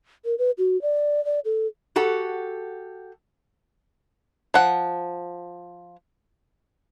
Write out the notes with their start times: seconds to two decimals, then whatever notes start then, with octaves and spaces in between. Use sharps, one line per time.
0.25 A#4
0.38 B4
0.58 F#4
0.82 D5
1.25 D5
1.45 A4
1.96 F#4 G4 A4 F#5
4.54 F3 F#5